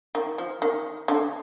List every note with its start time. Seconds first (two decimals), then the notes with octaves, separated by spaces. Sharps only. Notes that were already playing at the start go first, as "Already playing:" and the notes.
0.15 D#3
0.38 F3
0.62 D#3
1.08 D3